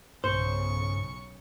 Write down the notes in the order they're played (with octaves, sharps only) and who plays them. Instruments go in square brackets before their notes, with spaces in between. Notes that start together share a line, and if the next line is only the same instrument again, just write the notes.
[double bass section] B1 C#3 [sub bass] G2 [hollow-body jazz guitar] C5 [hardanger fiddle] C#6